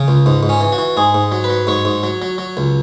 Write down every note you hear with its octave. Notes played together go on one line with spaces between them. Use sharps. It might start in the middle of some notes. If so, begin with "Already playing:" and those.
Already playing: C#3
C#2
G#2
G#2
C#4
E3
F#4
E3
G#2 G#4
G#2
F#3
B4
F#3
G#2 C#5
G#2
F#3
F#3
F#3
C#2